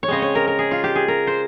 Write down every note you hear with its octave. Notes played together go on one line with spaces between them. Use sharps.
C#5
C#3 G#3 C4 D#5
C#5
A#4
A#4
G#4
F4
G4
G#4
A#4
C5